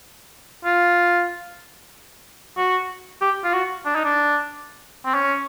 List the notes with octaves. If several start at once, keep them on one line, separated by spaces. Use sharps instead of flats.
F4
F#4
G4
F4
F#4
D4
D#4
D4
C4
C#4